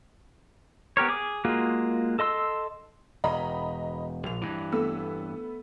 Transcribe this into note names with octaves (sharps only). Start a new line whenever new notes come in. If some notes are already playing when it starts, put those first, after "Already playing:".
B3 G4 A#4 C#5
G#4 D6
G#3 A#3 F4 F#4 G#4
A4 D#5 C6 E6
E1 D#5 A#5 B5
A#1 F7
G2 E3
A3 B3 E6